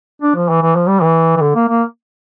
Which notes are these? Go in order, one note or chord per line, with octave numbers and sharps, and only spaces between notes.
D4
F3
E3
E3
F3
G3
E3
E3
D3
A#3
A#3